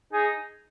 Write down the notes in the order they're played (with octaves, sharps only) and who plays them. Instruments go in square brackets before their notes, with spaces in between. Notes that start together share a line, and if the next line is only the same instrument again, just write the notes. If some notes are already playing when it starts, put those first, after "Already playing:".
[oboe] D#4 [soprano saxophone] G#4